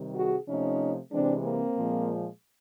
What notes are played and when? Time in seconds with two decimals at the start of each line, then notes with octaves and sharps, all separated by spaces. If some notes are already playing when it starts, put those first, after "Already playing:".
Already playing: C3 D#3 G3
0.15 F#4 G#4
0.48 C3 F3 A3 C#4 D#4
1.12 C3 E3 G#3 C4 D4
1.44 A#3 C4
1.76 A#2 F3 G#3